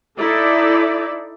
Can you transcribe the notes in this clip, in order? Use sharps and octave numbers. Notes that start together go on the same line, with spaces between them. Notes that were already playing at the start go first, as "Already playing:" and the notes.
D#4 E4 A4 D5